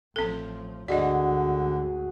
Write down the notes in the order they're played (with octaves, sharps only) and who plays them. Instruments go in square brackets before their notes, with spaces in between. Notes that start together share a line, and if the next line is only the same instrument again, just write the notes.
[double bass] A1 F3 [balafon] C4 A4
[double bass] D2 G#2 [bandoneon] D3 [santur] F#4 G#4 [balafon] D5 D#5